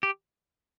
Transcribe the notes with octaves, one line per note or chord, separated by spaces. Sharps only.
G4